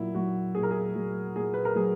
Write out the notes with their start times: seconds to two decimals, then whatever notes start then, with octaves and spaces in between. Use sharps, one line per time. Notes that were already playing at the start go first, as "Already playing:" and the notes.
Already playing: A#2 F#3 E4
0.15 F#3 F#4
0.55 A#2 G#4
0.63 A#4
0.71 G#4
0.95 F#3
1.36 A#2 G#4
1.54 B4
1.65 A#4
1.75 F#3 G#4